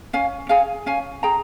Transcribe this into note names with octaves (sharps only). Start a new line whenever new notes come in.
C#4 F5 G#5
G#4 F5 G#5
C#4 F5 G#5
G#4 G5 A#5